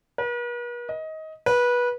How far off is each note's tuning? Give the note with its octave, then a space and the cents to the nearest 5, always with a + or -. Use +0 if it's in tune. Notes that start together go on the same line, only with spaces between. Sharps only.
B4 -45
D#5 +20
B4 -20